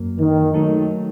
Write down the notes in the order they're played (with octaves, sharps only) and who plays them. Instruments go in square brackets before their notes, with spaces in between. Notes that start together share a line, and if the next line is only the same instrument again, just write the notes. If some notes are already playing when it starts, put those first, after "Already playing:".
Already playing: [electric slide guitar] F#2 F#3 A#3
[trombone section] D#3
[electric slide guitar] F#3 A3 D#4 A4